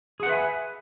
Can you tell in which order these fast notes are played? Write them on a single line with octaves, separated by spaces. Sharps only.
G#4 F#5 B4 E5 G#5